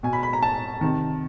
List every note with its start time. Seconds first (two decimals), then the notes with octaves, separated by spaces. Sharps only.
0.03 B2 G#5
0.13 B5
0.23 B5
0.33 A#5
0.43 A5
0.81 C3 D#3